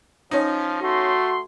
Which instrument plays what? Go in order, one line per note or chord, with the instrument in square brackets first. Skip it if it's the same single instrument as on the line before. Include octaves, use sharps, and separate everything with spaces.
[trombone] F3 [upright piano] C#4 D#4
[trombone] A3 [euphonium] F#4 [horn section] C6